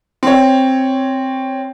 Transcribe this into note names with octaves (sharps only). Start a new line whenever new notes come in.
C4 C#5